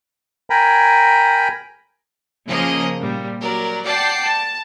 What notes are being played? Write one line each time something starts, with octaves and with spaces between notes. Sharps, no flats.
A#4 G5 G#5 A#5 B5
C#3 F3 A#3 G#4 A#4 D#5
A#2 G3
F#3 A#4 D5
D5 F#5 G5 A5 D6 C7
A5